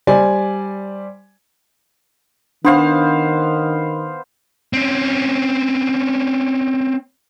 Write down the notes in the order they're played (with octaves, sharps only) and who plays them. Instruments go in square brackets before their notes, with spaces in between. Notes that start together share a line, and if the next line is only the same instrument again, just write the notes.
[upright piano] G3 C5 D5 G#5
[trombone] D#3 [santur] B3 C5 F5 [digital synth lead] D4
[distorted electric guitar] C4 C#4